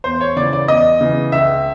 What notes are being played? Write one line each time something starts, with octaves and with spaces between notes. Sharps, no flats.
E2 C5
C#5
C#3 E3 D5
D5
E2 D#5
C#3 E3
C#2 E5